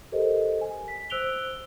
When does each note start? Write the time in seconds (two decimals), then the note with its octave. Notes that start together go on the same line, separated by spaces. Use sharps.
0.12 G4 A4 A#4 C5 D#5
0.61 G#5
0.88 B6
1.10 C5 E6 F#6 D7 F7 G7